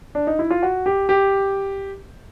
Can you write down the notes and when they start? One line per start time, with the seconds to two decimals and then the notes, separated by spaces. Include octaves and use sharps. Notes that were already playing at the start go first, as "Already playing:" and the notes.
0.15 D4
0.27 D#4
0.39 E4
0.51 F4
0.63 F#4
0.86 G4
1.09 G4